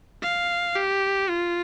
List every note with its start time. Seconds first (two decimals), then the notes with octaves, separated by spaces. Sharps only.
0.23 F5
0.76 G4
1.29 F4